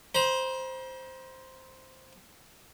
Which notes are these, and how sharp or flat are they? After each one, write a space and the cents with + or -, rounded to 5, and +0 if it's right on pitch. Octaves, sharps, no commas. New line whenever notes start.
C5 +0 A#5 +45